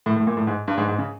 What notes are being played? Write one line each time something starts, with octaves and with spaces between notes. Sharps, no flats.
A2
A2
A#2
A2
G#2
G2
G#2
G#2
C#3